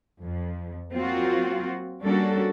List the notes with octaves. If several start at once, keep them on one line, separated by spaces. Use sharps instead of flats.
F2
F#3 A#3 C4 F4 F#4
G3 A#3 C#4 D4 F#4 A4